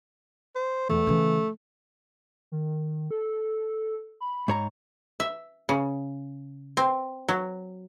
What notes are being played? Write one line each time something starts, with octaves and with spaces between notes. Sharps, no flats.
C5
E2 A3
C#3 E3
D#3
A4
B5
G#2 C#5 A#5
E5
C#3
C4
F#3